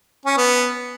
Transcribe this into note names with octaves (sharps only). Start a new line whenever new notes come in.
C#4
B3